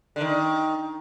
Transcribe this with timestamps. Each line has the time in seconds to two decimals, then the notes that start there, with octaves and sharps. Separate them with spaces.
0.16 D3
0.21 D#3